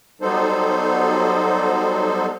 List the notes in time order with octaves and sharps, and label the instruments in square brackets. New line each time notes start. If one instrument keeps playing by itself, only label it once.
[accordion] F#3 G3 B3 D#4 A4 C5